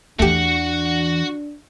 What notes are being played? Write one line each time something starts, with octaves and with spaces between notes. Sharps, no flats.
E2 E3 A3 D4 F#4 G4 F#5